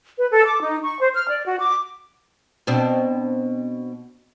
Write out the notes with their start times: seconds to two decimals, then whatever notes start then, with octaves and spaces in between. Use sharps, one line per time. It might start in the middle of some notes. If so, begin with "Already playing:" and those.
0.18 B4
0.31 A4
0.46 D6
0.61 D#4
0.83 C#6
1.00 C5
1.14 F6
1.29 D5
1.45 F#4
1.59 D6
2.67 B2 C4 D4